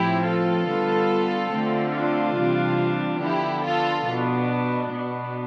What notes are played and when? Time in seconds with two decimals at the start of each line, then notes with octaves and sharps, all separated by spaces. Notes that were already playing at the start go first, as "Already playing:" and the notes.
Already playing: A2 F3 C4 E4 G4
0.24 F4 A4
0.67 D3 G3 B3
1.51 D3 A3 C4
1.93 D4 F4
2.36 C3 E3 G3
3.20 D3 F3 B3 D4 E4 G4
3.63 F4 A4
4.06 B2 B3 D4
4.90 B2 B3 D4